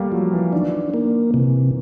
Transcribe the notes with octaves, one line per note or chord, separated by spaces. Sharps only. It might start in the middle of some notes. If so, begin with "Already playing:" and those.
Already playing: G3 A3 A#3
F3 F#3
E3
D#3 D4
A#3
C3 E3